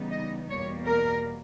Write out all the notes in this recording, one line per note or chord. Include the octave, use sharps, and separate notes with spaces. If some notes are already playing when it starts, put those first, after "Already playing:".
Already playing: C#3 E3 G3 B3 D#4
D#5
E2 B2 G3 A#3 C#5
A#4